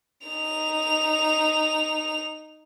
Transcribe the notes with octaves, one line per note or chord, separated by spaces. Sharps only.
D#4 F7